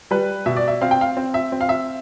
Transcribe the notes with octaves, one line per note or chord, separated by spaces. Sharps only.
G3 B4
B2 E5
D5
E5
C4 F5
G5
F5
C4
E5
C4
F5
E5